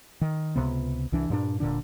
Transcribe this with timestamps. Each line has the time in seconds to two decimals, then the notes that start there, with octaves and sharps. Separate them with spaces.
0.21 D#3
0.56 C#2 G#2 C3 B3
1.12 C2 E3 D4
1.30 G2 A#2 D4
1.60 D#1 A#2 D3 D4